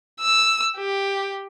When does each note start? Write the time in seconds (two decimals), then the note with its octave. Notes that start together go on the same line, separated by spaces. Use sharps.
0.21 E6
0.77 G4